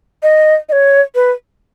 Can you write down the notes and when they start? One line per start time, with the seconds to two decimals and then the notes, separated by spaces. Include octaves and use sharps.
0.23 D#5
0.69 D#5
0.72 C#5
1.15 B4